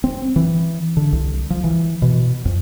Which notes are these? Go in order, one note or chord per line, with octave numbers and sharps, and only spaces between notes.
C4
E3
D3
C2
F3
E3
B2
F2